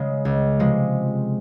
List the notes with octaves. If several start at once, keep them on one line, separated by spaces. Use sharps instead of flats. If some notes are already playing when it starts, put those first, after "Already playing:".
Already playing: C#3 G#3
C#2
C3 F3 G#3